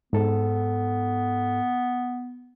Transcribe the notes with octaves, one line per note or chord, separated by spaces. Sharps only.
G#2 B3 A4